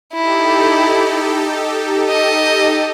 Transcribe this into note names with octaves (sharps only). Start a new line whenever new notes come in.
D#4 E4 G4 A4
D#5